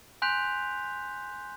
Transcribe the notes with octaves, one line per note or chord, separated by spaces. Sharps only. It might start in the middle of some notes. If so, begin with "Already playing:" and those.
G#5 C6 F#6 G6 B6 F7